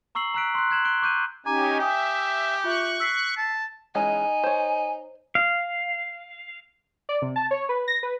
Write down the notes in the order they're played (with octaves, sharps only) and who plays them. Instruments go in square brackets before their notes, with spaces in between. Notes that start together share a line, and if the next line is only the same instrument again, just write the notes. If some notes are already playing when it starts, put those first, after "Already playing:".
[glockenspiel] A#5 C#6 E6 C7 F#7
A#5 C#6 E6 F#6 B6 D7
C6 F#6
F#6 G#6 E7 F#7
F#6 D7 G7
C#6 D6 F#6 G6 D#7
[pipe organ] C#4 D#4 G4 [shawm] G#5 [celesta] A#5 D6
[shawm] G4 [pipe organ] E5 [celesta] G5 G#5 D#6
[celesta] F4 E5 [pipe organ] C#6 F#6
[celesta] E6 B6 C7
[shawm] A5
[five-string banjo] E3 G#3 C#4 [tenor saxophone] D#4 [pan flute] G#5
[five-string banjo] C5 C#5
[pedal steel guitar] F5
[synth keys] D5
C3
A5
C#5
B4
A#6
B4